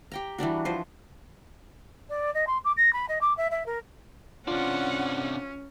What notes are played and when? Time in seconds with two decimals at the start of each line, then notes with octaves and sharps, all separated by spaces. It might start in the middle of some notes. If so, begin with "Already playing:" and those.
0.12 G4 G5 A#5
0.38 E3 G3 D4 F#4
0.65 E3 F3 C5
2.09 D5
2.34 D#5
2.47 C6
2.64 D6
2.77 A#6
2.93 B5
3.08 D#5
3.21 D6
3.37 E5
3.51 E5
3.66 A#4
4.48 C3 C#4 D4 F4 F#5